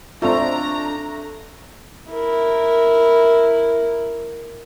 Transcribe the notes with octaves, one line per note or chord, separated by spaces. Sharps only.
A3 C4 D4 F4 D#5 F5 A#5
E4 A#4